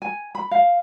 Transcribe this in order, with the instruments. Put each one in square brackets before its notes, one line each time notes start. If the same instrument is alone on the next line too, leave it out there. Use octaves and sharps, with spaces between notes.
[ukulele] G#5
B5
F5